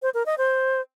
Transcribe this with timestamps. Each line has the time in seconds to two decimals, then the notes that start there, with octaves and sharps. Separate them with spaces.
0.02 C5
0.14 A#4
0.26 D#5
0.38 C5